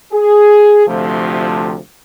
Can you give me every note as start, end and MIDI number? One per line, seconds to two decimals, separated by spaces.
0.13 0.88 68
0.88 1.77 38
0.88 1.77 48
0.88 1.77 53
0.88 1.77 57